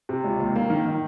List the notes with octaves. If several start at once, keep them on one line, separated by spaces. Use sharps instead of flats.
C3
C#2
D#2
A#3
D#3
D#3